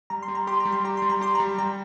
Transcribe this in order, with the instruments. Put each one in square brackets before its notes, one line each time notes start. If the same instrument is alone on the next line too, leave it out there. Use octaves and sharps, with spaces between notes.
[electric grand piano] G3 [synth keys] A#5
[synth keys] C6
[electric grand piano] G3
[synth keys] A#5
[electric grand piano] G4 [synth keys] C6
[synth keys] A#5
[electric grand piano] G3
[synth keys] C6
[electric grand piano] G4 [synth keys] A#5
[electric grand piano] G3 [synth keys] C6
[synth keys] A#5
[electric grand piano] G4 [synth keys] C6
[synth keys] A#5
[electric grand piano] G3
[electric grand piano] G3 [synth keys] A#5